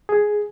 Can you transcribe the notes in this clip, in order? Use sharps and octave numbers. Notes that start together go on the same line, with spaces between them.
G#4